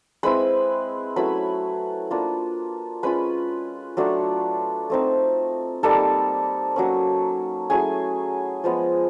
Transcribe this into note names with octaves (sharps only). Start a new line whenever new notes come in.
G#3 C4 E4 B4 B5
F#3 A3 C#4 E4 B4 B5
A#3 D4 F4
G#3 C#4 F4 B4 B5
F#3 A3 D4 F4
A3 C4 D#4
G3 A#3 D#4 A4 A5
F#3 A#3 C#4
F#3 A3 C#4 E4 G#4 G#5
F3 G#3 B3